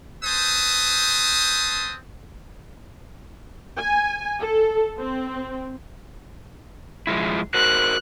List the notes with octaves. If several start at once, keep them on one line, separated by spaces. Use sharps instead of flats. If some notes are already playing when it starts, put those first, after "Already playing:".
C4 B4 C5 A5 D#6
G#5
A4
C4
F3 G#3 E4
F#4 A#4 C5 F#6